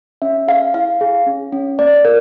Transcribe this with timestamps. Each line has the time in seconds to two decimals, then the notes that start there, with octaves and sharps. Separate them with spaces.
0.22 C#4 E5
0.48 G#4 F5
0.74 E4 F5
1.01 G#4
1.27 C#4
1.52 C#4
1.79 A#3 D5
2.05 A#4